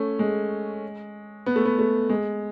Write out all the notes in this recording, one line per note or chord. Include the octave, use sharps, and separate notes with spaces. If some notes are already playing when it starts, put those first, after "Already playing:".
Already playing: A3 C#4
G#3
B3
A3
B3
A3
G#3